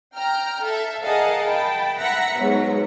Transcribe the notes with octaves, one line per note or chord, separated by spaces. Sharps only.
G5 A#5 F6
A4 E5
G#4 A#4 D#5 F5 F#5 A5
G5 A5 B5
E5 F#5 A#5 A#6 B6 C#7
G#2 B2 F#3 G#3